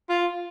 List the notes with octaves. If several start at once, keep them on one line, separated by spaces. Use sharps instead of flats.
F4